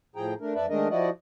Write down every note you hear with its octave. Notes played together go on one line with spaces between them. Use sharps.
A2 F3 G#4 G5 A#5
A3 D4 A#4
F2 A4 B4 D5 E5
D#3 G#3 A3 D4 A#4 D#5
F3 E4 F#4 D5 D#5